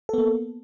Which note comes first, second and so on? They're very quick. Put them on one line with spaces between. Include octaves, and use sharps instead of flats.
A4 B3 A#3